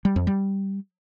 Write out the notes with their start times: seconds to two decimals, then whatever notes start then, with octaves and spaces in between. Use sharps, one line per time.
0.05 G3
0.16 F2
0.27 G3